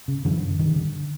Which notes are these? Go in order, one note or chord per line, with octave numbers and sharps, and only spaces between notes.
C#3
F#2 D3 E3
C#3
G2 D#3
D3